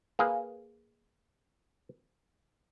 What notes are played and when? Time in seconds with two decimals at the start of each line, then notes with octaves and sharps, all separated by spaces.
0.19 A#3 G#4 B4